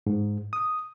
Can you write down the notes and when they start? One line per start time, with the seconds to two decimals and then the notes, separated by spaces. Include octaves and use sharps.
0.07 G#2
0.53 D#6